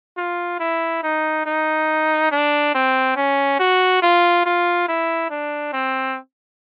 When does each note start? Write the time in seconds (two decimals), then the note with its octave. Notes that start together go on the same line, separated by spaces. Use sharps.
0.17 F4
0.60 E4
1.03 D#4
1.46 D#4
2.32 D4
2.74 C4
3.16 C#4
3.59 F#4
4.02 F4
4.46 F4
4.88 E4
5.30 D4
5.73 C4